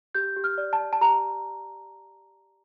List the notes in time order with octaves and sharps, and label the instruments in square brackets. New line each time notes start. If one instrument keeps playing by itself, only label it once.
[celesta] G4 G6
G4
F6
D5
A5
D5
A5
G4 A#5